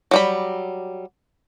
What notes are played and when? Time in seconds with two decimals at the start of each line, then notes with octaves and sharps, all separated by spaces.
0.11 F#3 G3 B5